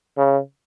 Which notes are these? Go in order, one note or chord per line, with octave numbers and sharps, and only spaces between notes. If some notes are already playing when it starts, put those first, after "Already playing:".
C#3